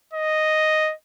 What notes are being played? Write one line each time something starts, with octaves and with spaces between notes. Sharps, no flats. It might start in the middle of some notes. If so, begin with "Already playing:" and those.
D#5